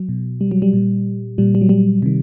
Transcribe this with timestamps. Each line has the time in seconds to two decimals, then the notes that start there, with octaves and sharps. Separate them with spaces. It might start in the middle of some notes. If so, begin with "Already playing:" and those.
Already playing: F#3
0.09 B2
0.41 G3
0.51 F#3
0.62 G3
0.73 A#2
1.38 A#2 G3
1.55 G3
1.61 F#3
1.69 G3
2.02 C3 D#3